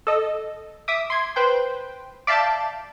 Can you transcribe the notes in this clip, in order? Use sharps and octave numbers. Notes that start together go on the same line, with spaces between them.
A4 D#5
E5 D6 D#6
C6 G#6
B4 C5 G5
D5 E5 F5 A5 G6 A6